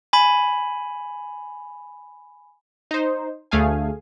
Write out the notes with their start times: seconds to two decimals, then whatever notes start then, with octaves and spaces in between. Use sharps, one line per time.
0.13 G#5 B5
2.91 D#4 C5
3.51 D2 A3 G#4 F5 G#5